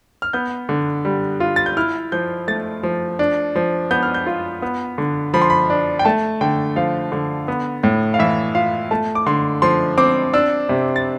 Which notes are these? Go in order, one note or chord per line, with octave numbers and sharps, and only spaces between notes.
F6
B3 G6
D3
G3
F4
A6
G6
E4 F6
F3 G6
A3 A6
F3
D4
F3
B3 G6
F6
G6
F4
B3
D3
F3 B5
C6
B5
D4
G5
A3 A5
D3 G5
F3 F5
D3
B3
A2
F5
E3 E5
F4 F5
A3 A5
D6
D3 C6
F3 C6
C4 D6
D4 E6
C3
A6